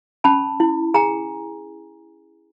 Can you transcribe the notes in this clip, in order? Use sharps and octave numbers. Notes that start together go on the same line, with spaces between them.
C#4 A5 B5
E4
G#4 G#5 A#5